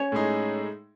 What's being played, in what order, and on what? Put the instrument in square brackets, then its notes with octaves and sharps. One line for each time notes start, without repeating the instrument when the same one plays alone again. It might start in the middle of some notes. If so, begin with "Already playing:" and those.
Already playing: [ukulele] C#4 C#5
[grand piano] A2 G#3 D#4 G#4